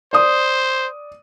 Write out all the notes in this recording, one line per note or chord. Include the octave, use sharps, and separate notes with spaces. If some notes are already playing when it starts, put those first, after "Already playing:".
C5 D5 D#6